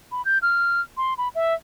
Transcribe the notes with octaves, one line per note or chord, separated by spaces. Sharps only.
B5
G6
F6
C6
B5
E5